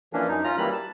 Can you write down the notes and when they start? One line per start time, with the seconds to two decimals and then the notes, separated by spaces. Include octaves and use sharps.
0.13 E3 F3 A#3 C#4 D4
0.28 F#2 D#4
0.44 C#4 F4 A#5
0.58 E3 F#3 G3 A#3 B5 F#6
0.73 A5